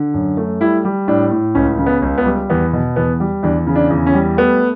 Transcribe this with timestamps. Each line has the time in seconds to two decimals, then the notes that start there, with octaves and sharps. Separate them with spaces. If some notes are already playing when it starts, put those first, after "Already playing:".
Already playing: D3
0.14 F#2
0.37 A3
0.60 G3 E4
0.85 G3
1.08 A2 D4
1.31 A2
1.55 C#2 C#4
1.78 C#3
1.86 B3
2.02 C#2
2.18 B3
2.26 G3
2.50 E2 B3
2.73 B2
2.96 E2 B3
3.20 G3
3.43 E2 D4
3.67 C#3
3.75 D4
3.90 E2
4.06 C#4
4.14 G3
4.37 A3 B3